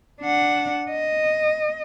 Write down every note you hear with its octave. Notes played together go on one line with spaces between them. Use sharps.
D4 F#5
D#5